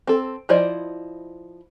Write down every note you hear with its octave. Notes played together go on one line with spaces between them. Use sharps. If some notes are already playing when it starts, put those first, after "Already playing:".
C4 A4
F3 E4 C5 D5 D#5